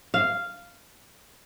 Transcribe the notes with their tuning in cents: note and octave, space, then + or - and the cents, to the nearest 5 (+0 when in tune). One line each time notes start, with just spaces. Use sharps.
F5 -5